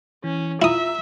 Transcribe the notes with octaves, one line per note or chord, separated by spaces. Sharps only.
E3 C#4
E4 F4 E5 A#5 D#6